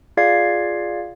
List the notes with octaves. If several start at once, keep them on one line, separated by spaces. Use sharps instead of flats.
F4 G#4 D5 F5 G#6 C7